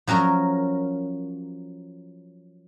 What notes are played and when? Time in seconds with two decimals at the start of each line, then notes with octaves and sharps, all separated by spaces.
0.07 F3 F#3 C#4 A#4